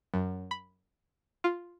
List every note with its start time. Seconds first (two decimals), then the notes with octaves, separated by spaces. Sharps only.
0.14 F#2
0.51 B5
1.44 F4